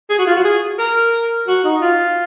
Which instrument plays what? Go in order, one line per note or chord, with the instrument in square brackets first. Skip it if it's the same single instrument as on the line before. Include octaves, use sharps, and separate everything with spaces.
[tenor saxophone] G#4
F#4
F4
F#4
G#4
A#4
F#4
D#4
F4